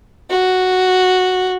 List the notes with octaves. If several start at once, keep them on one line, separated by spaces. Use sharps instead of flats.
F#4